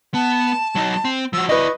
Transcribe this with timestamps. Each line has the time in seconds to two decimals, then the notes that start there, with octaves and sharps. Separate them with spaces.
0.14 B3 A5
0.75 F#3 D#4
1.05 C4
1.33 F3 F#4 E6
1.49 E4 B4 D5 D#5 C#6